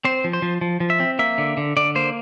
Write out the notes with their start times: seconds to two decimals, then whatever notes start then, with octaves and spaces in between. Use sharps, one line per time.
0.05 C4 C5
0.24 F3
0.33 C5
0.42 F3
0.61 F3
0.80 F3
0.90 E5
1.00 C4
1.19 A#3 E5
1.38 D3
1.57 D3
1.77 D3 D5
1.95 A#3 C5